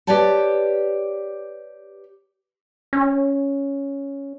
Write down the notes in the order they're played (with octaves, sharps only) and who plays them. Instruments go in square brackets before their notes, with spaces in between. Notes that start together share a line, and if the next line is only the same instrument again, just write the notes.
[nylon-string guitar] G4 B4 C#5 D5 G5 A5
[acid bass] C#4